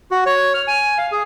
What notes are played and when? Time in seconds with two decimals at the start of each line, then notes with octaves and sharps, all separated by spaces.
0.11 F#4
0.26 C#5
0.54 F6
0.67 G#5
0.98 F5
1.12 G#4